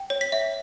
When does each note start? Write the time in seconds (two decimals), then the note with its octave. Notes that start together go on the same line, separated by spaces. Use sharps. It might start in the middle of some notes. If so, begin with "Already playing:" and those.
Already playing: G5
0.10 C#5
0.21 B6
0.32 E5